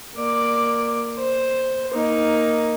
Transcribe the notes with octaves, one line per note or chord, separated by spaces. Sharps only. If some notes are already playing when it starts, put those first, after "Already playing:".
A#3 D5
C5
A#3 D#4